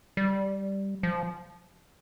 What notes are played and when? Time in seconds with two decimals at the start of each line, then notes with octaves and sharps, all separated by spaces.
0.17 G3
1.03 F3